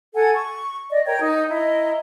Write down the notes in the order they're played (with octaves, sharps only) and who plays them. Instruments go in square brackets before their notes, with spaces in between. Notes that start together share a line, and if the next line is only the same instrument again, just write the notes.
[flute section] A4 F#5 G#5
C#6
D5 D#5
A#4 C#5 G5
D#4
E4 D#5 A#5